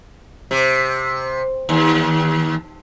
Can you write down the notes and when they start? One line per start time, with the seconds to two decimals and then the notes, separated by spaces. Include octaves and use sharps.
0.51 C3
1.69 D#2